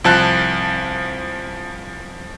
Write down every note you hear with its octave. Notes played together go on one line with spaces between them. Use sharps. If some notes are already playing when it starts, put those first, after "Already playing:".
C2 F3 A5 F#6